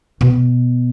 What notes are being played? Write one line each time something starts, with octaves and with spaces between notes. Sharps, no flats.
B2